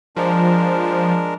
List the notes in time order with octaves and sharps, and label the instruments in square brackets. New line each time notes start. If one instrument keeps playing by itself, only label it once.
[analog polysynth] F3 [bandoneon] G#3 D4 A#4